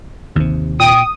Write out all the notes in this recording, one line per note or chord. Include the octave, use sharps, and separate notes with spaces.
G1 D#2 C3
A#2 G5 D#6